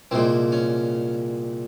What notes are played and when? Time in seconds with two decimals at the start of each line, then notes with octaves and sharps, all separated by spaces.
0.11 C2 A#2 G#3 C4
0.52 C#4